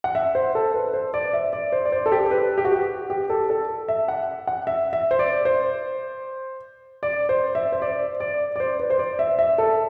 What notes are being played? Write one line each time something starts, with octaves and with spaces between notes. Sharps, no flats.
F#5
E5
C5
A4
B4
C5
D5
E5
D5
C5
D5
C5
A4
G4
B4
G4
F#4
G4
G4
A4
A4
E5
F#5
F#5
E5
E5
C5
D5
C5
D5
C5
E5
C5
D5
D5
D5
C5
B4
C5
D5
E5
E5
A4